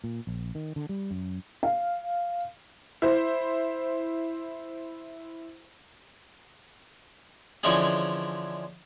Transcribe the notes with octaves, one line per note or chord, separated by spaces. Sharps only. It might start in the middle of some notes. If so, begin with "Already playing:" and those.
A#2
A#1
D#3
D3
G3
F#2
F5
E4 C5
D3 E3 F3 G#3 C#4 G#4